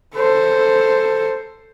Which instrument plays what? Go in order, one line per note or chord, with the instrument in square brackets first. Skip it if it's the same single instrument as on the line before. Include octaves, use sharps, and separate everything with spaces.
[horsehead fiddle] A4 C5